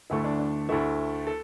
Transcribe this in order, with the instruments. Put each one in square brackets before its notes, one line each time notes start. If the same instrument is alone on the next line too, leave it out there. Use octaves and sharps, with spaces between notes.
[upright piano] D2 D3 A3 E4
D4
D4
D2 D3 A3 E4
A4